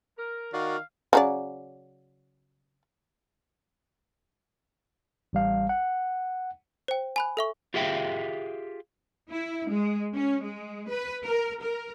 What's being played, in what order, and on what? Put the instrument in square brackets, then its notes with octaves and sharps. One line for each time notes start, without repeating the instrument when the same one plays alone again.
[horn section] A#4
[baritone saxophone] D#3 [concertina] F#4 D5 [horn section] F5
[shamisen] C#3 F#3 D5
[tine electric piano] A1 G3 F5
F#5
[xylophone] C5 G5
G#5 B5 F#6
A4 E5 C#6
[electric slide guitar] F4 G4 G#4 E5 F5 G5
[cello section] E4
G#3
C#4
G#3
B4
A#4
A#4